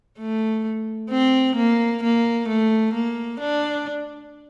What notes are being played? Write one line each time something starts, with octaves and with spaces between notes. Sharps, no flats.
A3
C4
A#3
A#3
A3
A#3
D4